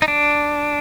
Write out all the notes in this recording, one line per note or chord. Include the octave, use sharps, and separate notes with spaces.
D#4
D4